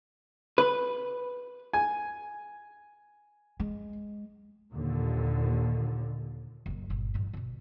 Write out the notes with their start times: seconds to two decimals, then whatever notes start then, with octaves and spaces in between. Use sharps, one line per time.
0.58 B4
1.73 G#5
3.60 G#3
4.74 D#2 A#2 D3
6.66 F#1 F#2
6.89 G1 A#2
7.14 A1 G2
7.33 B2 D3